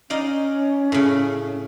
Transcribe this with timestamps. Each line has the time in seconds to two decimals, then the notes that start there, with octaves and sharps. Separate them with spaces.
0.10 C#4 D#4 D5 F5
0.92 A2 C#3